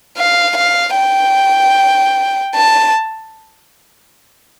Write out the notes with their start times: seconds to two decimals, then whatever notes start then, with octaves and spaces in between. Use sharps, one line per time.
0.18 F5
0.57 F5
0.97 G5
2.55 A5